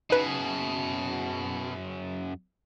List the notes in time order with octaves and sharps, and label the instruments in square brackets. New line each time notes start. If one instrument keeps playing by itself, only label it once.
[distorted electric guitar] F#2 G#4 [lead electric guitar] B2 [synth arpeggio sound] D#4 B4